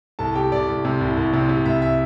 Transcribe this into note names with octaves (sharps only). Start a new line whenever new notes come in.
C2 A4 A5
C3 G4 G5
C2 D5
C2
C3
C2
C2
C3
C3
C2 E5
E5